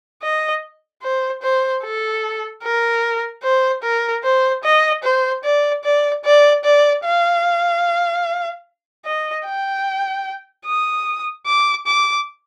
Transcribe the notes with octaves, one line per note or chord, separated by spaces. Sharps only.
D#5
C5
C5
A4
A#4
C5
A#4
C5
D#5
C5
D5
D5
D5
D5
F5
D#5
G5
D#6
D6
D6